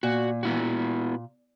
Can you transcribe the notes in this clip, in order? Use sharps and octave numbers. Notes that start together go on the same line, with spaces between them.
A#2 F#4
B3 E4 F#4